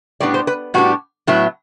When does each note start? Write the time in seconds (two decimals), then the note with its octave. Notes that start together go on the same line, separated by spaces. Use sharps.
0.20 A2 G3 B3 D4 D5
0.34 C5
0.47 B4
0.74 A2 G3 B3 D4 F#4
1.27 A2 F#3 B3 E4